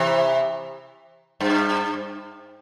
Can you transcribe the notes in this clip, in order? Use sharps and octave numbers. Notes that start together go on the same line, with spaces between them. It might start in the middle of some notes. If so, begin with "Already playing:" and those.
Already playing: C3 E3
G2